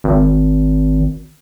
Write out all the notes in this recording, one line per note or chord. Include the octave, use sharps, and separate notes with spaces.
G#1